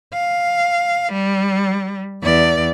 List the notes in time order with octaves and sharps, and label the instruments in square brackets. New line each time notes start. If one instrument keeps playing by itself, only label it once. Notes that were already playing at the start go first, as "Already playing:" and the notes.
[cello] F5
G3
E2 D5